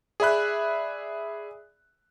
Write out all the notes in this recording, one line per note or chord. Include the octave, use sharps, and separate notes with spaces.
G#4 D5 E5 B5 F#6